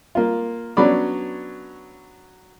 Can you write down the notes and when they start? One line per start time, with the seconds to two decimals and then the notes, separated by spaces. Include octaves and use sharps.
0.15 A#3 F4
0.77 F#3 B3 C#4 D4 D5 B5